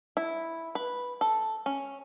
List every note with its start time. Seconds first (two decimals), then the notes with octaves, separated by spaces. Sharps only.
0.17 E4
0.75 B4
1.21 A4
1.66 C#4